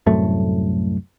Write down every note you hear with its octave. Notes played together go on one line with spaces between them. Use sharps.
C2 F#2 A2 A3